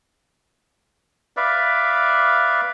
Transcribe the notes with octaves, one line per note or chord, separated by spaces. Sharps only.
B4 D5 E5 F5